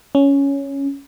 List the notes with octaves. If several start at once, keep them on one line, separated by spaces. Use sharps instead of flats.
C#4